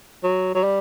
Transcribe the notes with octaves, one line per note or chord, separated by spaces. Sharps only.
F#3
F#3
G3